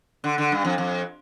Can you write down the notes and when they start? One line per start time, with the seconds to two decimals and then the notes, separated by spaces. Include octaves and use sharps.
0.24 D3
0.38 D3
0.52 G2
0.65 F2
0.78 F2